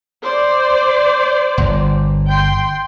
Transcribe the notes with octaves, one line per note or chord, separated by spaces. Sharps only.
C5 D5
G1
G5 C6